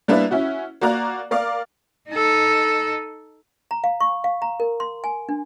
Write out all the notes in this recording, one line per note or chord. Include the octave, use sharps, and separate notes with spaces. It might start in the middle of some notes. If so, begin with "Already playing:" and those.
G3 A#3 B3 D4 E4 B4
C#4 E4 F#4
A#3 F#4 D5 A#5 F#6
A#4 D5 F5 D6
D#4 A4
A#5
F5
C#6
F5
A#5
A#4
C6
G#5
D4